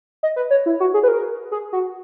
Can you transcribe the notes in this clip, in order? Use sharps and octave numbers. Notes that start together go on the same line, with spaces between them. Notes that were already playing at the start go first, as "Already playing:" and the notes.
D#5
B4
C#5
E4
F#4
G#4
B4
A#4
G#4
F#4